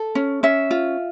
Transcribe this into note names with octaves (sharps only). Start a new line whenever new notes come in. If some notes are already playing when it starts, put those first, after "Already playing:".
Already playing: A4
C#4
C#4 E5
F4